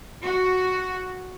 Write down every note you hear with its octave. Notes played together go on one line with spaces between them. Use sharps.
F#4